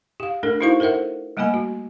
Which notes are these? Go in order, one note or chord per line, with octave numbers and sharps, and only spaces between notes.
G4 F5
A3 D4 A4 A#4
D#4 E4 F#4 C5 F5 C#6
A4 A#4 C5 E5 F#5
G3 A3 A#3 D#5 G#5 B5
F#4